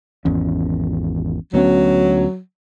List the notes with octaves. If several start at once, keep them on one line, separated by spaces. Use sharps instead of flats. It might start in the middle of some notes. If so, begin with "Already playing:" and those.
G#1 E2 C#4
D2 F#3 B3 C#4